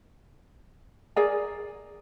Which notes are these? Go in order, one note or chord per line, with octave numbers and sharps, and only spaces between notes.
G#4 A#4 D5 G#5